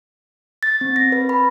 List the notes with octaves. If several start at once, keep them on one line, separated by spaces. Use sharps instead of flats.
A6
C4
A#6
B4
B5